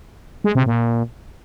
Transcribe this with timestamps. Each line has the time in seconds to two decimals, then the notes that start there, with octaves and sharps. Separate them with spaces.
0.44 G#3
0.55 C3
0.66 A#2